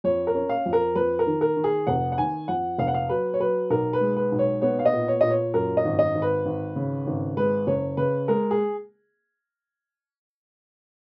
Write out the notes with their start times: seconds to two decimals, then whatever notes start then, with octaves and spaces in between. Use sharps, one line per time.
0.04 F2 C#5
0.27 A#4
0.35 C#4
0.49 F5
0.66 F2
0.73 A#4
0.95 F2 B4
1.19 A#4
1.27 D#3
1.41 A#4
1.57 D#3
1.64 G#4
1.87 F1 F#5
2.12 F#5
2.18 D#3 G#5
2.48 F2 F#5
2.78 F1 F5
2.87 F#5
2.94 F5
3.09 F#3 B4
3.34 C#5
3.40 F#3 B4
3.70 B1 A#4
3.93 B4
4.01 G#3
4.17 B4
4.32 B1
4.39 C#5
4.62 B3 C#5
4.79 F5
4.85 D#5
4.93 A#2
5.08 C#5
5.21 A#2 D#5
5.30 C#5
5.54 F#2 A#4
5.77 D#5
5.85 G#1
5.99 D#5
6.15 G#1
6.22 B4
6.46 G#1
6.76 C#3
7.07 G#1
7.37 G#3 B4
7.67 F#1 C#5
7.97 C#3 B4
8.28 G#3 A#4
8.51 G#4